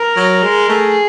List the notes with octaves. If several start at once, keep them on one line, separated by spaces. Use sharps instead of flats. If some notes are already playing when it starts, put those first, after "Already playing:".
Already playing: A#4
F#3
G#3
A3 G#4